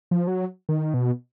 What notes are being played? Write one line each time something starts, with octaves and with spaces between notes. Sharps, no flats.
F3
F#3
D#3
B2